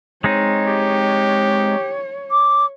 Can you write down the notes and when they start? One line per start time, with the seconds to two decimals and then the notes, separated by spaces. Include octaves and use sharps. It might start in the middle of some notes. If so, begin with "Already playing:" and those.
0.24 G#3 C4 D#4 C#5
0.67 G4
2.31 D6